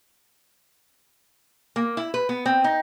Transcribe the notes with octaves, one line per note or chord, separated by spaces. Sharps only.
A#3
E4
B4
B3
C4
D#4